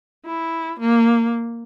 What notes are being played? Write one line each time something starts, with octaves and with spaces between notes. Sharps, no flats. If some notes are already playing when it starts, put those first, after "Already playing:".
E4
A#3